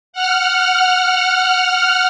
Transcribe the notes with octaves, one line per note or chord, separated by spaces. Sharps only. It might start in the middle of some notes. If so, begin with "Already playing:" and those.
F#5 F6